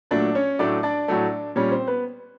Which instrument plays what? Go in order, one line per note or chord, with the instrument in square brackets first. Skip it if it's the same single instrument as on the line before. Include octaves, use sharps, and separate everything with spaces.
[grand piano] A#2 F#3 A3 D4 D5
C#4 C#5
A2 F#3 A3 D4 D5
D4 D5
A2 F#3 A3
A#2 G3 C#4 C#5
C4 C5
B3 B4